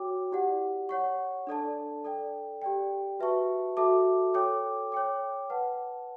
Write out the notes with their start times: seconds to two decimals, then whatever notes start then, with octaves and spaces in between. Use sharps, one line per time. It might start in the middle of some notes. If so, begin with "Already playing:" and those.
Already playing: F#4 C#5 G5 D6
0.32 E4 G4 D5 F#5
0.89 C#5 F#5 C#6
1.47 D4 A4 D5 A5
2.04 A4 D5 G5
2.62 G4 D5 G5
3.19 F#4 B4 E5 A5 C#6
3.77 F#4 A4 E5 A5 D6
4.34 A4 C#5 G5 D6
4.92 C#5 G5 D6
5.50 B4 F#5 A5